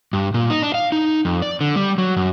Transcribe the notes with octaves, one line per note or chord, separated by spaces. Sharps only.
G2
A#2
D#4
D4
F5
D#4
F2
D5
D3
G3
F#3
F#2